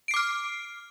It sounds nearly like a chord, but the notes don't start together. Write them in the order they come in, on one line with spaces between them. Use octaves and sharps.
D7 C7 D6 F6